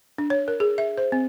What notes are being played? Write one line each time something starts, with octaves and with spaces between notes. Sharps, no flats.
D4
C#5
A#4
G#4
E5
C5
C4